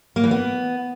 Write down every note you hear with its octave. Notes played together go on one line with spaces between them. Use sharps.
A#3
E3
B3